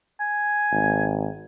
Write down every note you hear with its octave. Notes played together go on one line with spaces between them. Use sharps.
G#5
G#1